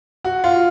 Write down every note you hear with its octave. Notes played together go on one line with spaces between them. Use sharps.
F#4
F4